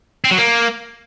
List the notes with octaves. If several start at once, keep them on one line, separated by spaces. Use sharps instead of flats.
C4
F#3
A#3